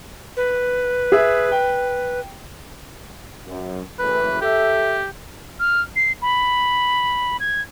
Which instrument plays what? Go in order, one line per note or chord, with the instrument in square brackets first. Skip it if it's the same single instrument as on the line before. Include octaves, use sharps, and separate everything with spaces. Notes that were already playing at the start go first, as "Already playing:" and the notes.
[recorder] B4
[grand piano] G#4 E5
G5
[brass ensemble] F#2
[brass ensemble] F#1 A2 E3 [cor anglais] B4
[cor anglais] G4 [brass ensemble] A4 E5
[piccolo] F6
C7
B5
G#6